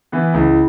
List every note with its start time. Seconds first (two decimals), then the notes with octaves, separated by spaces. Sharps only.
0.12 E3 B3
0.34 C#2 E4